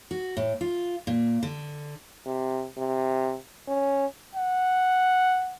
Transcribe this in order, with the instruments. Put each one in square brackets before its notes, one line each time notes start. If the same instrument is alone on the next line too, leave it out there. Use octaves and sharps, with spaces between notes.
[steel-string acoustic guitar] F#4
A2
F4
A#2
D3
[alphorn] C3
C3
C#4
[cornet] F#5